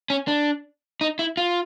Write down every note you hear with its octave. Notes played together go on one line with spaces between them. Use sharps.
C#4
D4
D#4
E4
F4